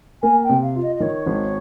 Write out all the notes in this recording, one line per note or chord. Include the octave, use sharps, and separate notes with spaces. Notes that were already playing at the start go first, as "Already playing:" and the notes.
A#3 G#5
G5
C3
F5
F4
D#5
D#5
D#3 C#5
G#1